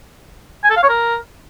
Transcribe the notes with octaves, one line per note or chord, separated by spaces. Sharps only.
G#5
A4
F5
C#5
A#4